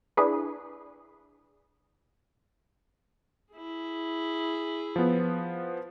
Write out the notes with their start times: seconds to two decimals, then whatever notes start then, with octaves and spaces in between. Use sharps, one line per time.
0.17 D4 E4 G#4 B4
3.53 E4 G#4
4.96 F3 B3